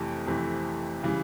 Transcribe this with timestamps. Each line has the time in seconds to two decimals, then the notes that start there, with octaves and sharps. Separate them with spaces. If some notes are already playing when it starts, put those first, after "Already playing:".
Already playing: F2 C3 E3 A3
0.27 F2 C3 E3 A3
1.03 C#3 E3 G3